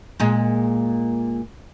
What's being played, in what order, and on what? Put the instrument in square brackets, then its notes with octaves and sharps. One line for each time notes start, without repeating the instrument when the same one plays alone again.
[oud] A#2 G#3